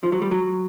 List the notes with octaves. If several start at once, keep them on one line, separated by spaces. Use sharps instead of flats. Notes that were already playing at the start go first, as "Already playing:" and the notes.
F3
F#3
G3
F#3